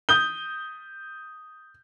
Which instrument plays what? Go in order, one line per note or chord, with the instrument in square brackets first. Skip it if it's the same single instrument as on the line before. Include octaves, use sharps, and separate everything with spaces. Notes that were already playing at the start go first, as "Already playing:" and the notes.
[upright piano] D#6 G6 G7